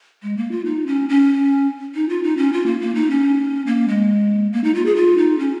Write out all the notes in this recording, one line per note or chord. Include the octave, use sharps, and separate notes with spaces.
G#3
A#3
F4
D#4
C#4
C#4
D#4
F4
D#4
C#4
F4
A#3
A#3
D#4
C#4
A#3
G#3
A#3
D#4
F4
G#4
F4
D#4
C#4